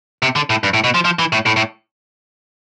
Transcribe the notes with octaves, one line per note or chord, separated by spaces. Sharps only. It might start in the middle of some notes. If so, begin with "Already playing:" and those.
C3
D3
A2
G2
A2
B2
F3
F3
E3
A2
A2
A2